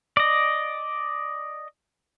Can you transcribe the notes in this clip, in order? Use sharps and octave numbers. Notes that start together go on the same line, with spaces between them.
D5 D#5